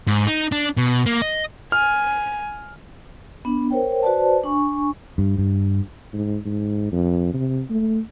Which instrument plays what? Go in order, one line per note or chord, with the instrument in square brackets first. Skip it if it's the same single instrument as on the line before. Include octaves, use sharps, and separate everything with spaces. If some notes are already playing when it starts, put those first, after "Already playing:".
[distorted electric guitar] G#2
D#4
D4
B2
A#3
D#5
[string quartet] G#5 [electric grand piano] F6
[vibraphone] B3 D4
A#4 C5 C#5 G5
F#4 B4 C5 D5 A5
D4 G#5 C#6
[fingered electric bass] G2
G2
[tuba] G#2
G#2
F2
C3
A3